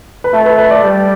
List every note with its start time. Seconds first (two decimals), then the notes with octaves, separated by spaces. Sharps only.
0.24 B4
0.33 A3 A4
0.46 B4
0.58 B4
0.71 D5
0.83 G3